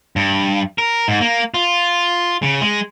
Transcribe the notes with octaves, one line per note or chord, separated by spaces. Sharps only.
G2
A#4
G#2
A#3
F4
C#3
G#3